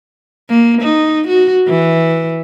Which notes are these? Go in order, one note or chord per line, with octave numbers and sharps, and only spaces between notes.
A#3
D#4
F#4
E3